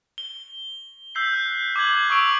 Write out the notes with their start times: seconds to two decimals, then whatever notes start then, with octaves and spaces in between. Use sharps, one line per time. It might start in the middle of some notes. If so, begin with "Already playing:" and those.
0.18 G7
1.15 E6 G6 B6 C7
1.33 F#6
1.76 D6 F#6 G#6 F#7
2.10 C#6 D#6 E6 D7